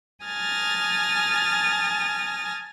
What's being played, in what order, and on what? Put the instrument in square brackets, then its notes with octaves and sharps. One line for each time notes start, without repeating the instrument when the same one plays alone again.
[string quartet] G#5 A5 D#6 F6 A6 A#6